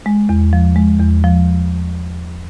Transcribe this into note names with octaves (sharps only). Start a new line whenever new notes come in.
G#3
E2
F3
G#3
E2
F3